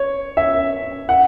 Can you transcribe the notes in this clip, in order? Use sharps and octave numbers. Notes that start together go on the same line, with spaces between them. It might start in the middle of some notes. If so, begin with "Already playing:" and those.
Already playing: C#5
E5
F#5